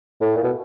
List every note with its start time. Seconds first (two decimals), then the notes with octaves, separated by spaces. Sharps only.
0.21 A2
0.36 A#2
0.44 B2